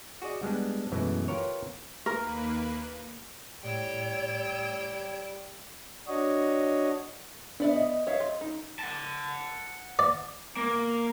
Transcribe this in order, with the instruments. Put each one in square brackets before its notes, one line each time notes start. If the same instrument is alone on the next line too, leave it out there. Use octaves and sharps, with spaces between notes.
[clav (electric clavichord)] F#4 G#4 D5 D#5
G3 G#3 B3 D4
F#2 B2 E3 G#3 A3
F4 G4 A#4 B4 C#5
[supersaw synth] D#2 A#3 B4 [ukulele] A#4
[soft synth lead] A2 [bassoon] G3 [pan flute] C#5 [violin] G5 E6
[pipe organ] D4 F#4 C#5 D#5
[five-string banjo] B3 D5 E5 [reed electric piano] D4
[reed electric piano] D#5
[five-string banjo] C#5 E5 F5
F4
D#4
[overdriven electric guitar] F#5 A5
[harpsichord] D5
[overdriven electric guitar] A#3